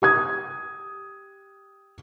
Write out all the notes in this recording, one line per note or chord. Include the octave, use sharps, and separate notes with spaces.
G4 D#6 G#6